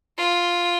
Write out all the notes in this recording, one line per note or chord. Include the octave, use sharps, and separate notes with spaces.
F4